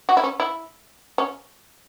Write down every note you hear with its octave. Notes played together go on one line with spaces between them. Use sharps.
F#4
E4
C#4
E4
C#4